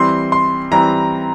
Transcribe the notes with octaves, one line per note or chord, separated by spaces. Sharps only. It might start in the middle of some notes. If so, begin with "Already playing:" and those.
Already playing: E3 G3 C4 C6
C6
E3 G3 C4 A#5